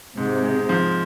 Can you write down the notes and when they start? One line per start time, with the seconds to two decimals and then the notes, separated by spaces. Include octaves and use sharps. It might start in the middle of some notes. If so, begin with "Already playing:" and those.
0.17 G#2 C3
0.42 G#3
0.69 F3